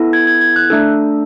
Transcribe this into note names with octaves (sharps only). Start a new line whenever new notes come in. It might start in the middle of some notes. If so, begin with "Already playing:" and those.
Already playing: B3 E4 A4
G#6
G#6
G#6
F#6
A3 D4 A4